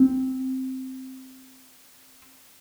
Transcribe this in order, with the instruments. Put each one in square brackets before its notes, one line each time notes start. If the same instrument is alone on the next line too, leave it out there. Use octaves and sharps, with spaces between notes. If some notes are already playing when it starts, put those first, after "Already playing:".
Already playing: [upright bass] C4